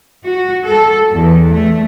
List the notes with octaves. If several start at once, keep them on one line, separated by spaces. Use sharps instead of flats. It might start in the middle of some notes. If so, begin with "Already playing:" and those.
F#4
A4
E2
A3